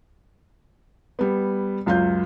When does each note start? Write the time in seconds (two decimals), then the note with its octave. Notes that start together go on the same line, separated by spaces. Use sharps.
1.19 G3 B3
1.86 C#2 F#2 F4 F5 G6